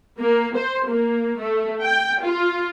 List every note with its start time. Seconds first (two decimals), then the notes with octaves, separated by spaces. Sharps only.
0.19 A#3
0.56 C5
0.88 A#3
1.39 A3
1.83 G5
2.22 F4